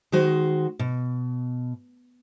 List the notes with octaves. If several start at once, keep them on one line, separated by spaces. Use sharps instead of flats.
D#3 G#3 F#4 C5
B2